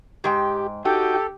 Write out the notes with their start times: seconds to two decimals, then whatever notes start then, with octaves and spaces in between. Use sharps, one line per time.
0.24 G#2 G#3 G4 G5
0.85 D#4 F#4 G4 A4 G5